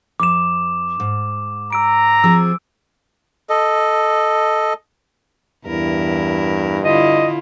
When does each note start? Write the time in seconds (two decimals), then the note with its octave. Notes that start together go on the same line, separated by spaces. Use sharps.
0.20 F2 D6 E7
1.00 G#2
1.73 A#5 E6 D7
2.24 F3 C4 G#4 E6
3.49 A4 D#5
5.66 E2 G2 E4 A#4
6.84 D3 E4 F4 D#5